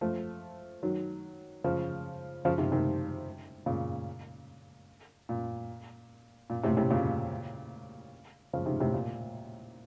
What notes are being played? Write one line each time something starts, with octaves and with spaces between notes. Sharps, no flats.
F3 A3
D#3 F#3
C#3 F3
C#3 F3
C3 D#3
C3 D#3
A#2 C#3
A#2
A#2
A2 C3
A2 C3
A#2 C#3
C#3 F3
C3 D#3
A2 C3
A#2